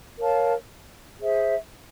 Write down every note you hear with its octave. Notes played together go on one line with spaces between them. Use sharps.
A#4 C#5 F5 A5
G#4 C5 E5